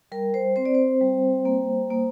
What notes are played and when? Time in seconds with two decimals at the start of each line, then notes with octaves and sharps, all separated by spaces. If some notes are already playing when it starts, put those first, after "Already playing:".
0.12 G3 A#4
0.34 C5
0.56 C4 C5
0.65 D5
0.75 C5
1.01 G3
1.45 A#3
1.91 A#3